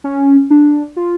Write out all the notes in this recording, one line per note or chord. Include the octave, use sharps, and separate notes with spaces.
C#4
D4
F4